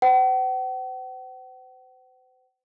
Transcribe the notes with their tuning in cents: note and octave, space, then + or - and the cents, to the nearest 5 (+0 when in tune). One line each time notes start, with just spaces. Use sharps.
C5 -40 F#5 +45